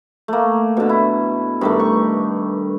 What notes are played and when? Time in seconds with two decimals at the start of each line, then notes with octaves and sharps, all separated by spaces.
0.28 A3 A#3
0.77 B2 D3
0.89 E4
1.61 G2 D#3 A3
1.79 C#6